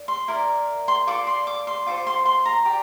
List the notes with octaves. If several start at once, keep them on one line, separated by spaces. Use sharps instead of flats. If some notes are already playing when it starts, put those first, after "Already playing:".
Already playing: D5
C6
E4 A#4 D5
C6
F4 A4 D5 D6
C6
D6
C6
F4 A4 C5 D6
C6
C6
A#5
G4 D5